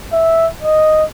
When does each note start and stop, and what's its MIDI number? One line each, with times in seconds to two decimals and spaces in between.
0.13 0.47 76
0.62 1.04 75